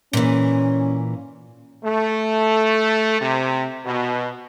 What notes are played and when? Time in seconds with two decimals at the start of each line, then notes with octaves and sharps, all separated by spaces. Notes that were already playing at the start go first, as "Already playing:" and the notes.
0.13 A#2 E3 C#4
1.84 A3
3.20 C3
3.86 B2